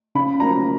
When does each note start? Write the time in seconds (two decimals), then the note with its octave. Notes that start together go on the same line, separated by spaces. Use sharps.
0.15 C#3 B5
0.40 F#3 A#3 C#4 A#5